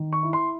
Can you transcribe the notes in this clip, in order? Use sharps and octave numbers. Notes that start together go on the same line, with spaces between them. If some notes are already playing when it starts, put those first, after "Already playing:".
Already playing: D#3
C#6
E4
C6